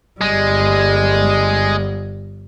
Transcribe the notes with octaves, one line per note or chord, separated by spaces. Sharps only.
G1 G3 G#3